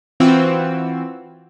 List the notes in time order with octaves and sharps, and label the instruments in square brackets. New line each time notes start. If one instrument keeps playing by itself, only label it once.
[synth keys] E3 C4 F4 F#4 E6